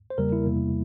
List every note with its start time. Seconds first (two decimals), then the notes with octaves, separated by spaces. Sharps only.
0.10 C5
0.18 E2 C#3 G3 A#3 A#4
0.32 E4
0.47 E2 C3 G3 A#3